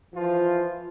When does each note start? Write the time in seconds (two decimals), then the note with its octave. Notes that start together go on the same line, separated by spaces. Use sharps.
0.13 E3 F3 F4